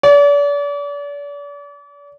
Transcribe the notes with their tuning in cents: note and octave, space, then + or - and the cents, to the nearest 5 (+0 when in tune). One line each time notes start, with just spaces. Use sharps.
D5 -40